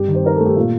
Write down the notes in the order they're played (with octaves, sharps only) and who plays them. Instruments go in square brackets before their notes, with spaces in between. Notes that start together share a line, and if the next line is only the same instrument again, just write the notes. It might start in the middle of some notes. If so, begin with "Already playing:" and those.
Already playing: [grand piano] G2 [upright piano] G4
[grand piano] D#3
[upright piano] C5
[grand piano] D#4 [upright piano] A#4
[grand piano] A3 [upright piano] A4
[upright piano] G4
[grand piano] A#2 [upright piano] F4